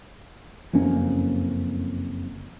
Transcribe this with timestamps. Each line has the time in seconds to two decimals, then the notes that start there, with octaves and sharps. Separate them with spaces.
0.73 F#1 F2 A#3 C#4